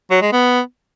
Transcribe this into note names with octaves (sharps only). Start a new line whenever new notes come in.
F#3
G#3
B3